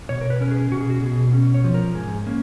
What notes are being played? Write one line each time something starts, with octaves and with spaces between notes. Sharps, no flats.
B2 C#5
A#4
B4
C#4 A#4
G#4
B2 F#4
G#4
F#4
B2 G#4
C#4
C#5
F3
A#4
G#2 G#4
A#3 C#4